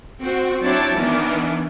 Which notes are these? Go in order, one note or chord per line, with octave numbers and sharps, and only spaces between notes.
C4 F#4
F#3 C4 D4 E4 C#5 A5
D#3 E3 B3 D4